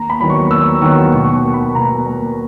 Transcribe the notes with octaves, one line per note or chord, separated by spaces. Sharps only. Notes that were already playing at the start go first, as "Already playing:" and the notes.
Already playing: D#2 A#5
B5
D#3 F#3 B3 B5
C#6
D#2 E6
D#3 F#3 B3 C#6
B2 C#6
C#6
A#3
B5
B2 A#5
A#3